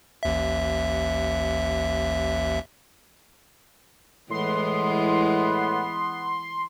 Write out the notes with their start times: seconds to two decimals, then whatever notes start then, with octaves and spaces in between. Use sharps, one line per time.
0.23 A1 D#2 E5
4.31 A2 E3 G#3 B3 C6